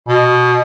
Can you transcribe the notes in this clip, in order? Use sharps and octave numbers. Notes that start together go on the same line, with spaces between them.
B2